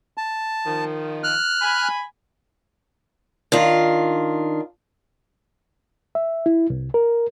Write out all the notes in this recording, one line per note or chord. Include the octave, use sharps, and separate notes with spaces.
A5
D#3 F3
F6 F#6
G#5 B5
D#3 D4 F4
E5
E4
C2
A#4